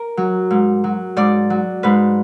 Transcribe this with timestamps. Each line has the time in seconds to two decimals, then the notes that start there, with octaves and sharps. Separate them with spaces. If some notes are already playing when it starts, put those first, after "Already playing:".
Already playing: A#4
0.17 F#3
0.50 G#2
0.84 F#3
1.16 G#2 D5
1.50 F#3
1.83 G#2 B4